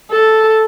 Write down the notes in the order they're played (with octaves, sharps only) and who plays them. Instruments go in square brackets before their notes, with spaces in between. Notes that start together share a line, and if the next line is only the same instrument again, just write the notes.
[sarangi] A4